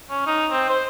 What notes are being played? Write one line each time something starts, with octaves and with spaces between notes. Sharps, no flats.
C#4
D#4
C4
C5